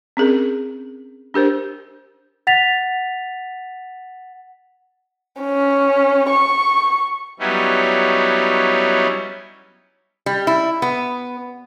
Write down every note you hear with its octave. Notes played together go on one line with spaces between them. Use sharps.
C4 C#4 G#4 A#4
D4 G4 A#4 C5
F#5 A6 B6 F7
C#4
C#6
F#3 G3 B3 C#4 D#4 E4
G3
E4
B3